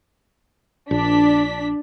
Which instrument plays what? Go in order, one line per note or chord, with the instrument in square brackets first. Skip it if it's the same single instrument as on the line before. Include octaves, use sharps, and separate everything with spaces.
[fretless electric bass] A#1 [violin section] D4 B6